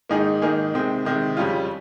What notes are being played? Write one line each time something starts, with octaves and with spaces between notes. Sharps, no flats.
G#2 D#3 A#3 D#4 G#4
G#2 D#3 A#3 D#4 G#4
C3 D#3 G#3 C4
C3 D#3 G#3 C4
F2 C#3 G3 C#4 F4